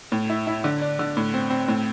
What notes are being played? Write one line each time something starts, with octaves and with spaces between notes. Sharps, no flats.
A2
E4
E4
D3
D4
D3
A2
C4
C4
A2